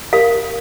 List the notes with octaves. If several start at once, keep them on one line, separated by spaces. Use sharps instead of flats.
A#4 F5